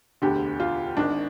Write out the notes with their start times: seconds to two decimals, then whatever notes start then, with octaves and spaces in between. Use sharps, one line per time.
0.22 E1 D2 D3 G4
0.60 F4
0.97 G#1 G#2 D#3 D4